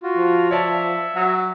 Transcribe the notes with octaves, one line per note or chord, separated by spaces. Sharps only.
F4 F#4
F3
C#5 D5 E5 A5
F#3